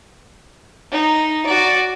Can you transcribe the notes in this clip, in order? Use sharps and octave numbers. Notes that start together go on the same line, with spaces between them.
D#4
F#4 D5